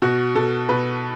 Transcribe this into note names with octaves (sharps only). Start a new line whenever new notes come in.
B2 F#4
B2 A4
B2 B4